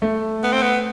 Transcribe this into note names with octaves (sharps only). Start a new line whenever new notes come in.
A3
B3
C4
B3